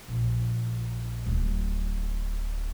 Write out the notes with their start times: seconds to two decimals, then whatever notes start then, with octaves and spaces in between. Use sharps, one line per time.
0.08 A#1
1.26 D1